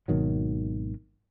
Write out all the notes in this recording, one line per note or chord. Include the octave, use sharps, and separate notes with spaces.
G#1 B2 D#3 F#3